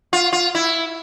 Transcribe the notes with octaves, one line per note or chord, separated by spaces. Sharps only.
F4
F4
E4